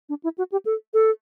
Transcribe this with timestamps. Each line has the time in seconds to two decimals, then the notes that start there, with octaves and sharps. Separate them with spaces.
0.09 D4
0.23 E4
0.38 F#4
0.52 G4
0.65 A4
0.94 A4